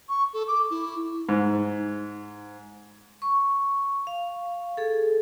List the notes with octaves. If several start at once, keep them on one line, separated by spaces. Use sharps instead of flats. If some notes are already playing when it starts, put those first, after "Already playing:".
C#6
A4
D6
E4
G#2
C#6
F5
G#4 A4